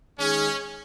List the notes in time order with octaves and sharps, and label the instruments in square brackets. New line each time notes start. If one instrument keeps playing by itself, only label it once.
[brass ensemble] D#3 G#3 D#4 G#4 [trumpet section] C#4